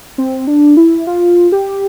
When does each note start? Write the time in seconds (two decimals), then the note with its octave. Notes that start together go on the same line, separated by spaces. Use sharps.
0.18 C4
0.47 D4
0.77 E4
1.07 F4
1.52 G4